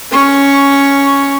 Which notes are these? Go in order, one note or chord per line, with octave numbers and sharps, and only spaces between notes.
C#4 C#6